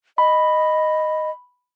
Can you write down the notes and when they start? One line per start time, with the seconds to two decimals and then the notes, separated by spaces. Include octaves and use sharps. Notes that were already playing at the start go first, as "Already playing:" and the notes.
0.18 D#5 B5